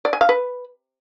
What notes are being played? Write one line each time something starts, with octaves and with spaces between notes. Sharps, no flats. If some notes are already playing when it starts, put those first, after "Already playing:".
D5
G#5
F5
B4